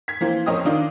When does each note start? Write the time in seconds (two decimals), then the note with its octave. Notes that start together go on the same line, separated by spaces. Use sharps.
0.08 G#6 B6
0.21 E3 F3 A#3 C4
0.46 F2 C#4 A#4 C5 D#5 D#6
0.65 D#3 D4 D#4 F4